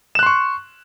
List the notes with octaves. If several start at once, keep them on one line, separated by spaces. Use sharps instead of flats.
C6 C#6 F#6 E7